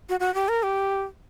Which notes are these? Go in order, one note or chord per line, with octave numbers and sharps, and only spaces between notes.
F#4
F#4
G4
A#4
G4